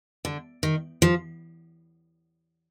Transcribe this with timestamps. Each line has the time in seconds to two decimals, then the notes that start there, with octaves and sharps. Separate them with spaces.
0.25 D3
0.63 D#3
1.02 F3